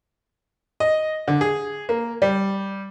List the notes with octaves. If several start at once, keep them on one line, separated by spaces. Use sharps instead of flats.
D#5
D3
G#4
A#3
G3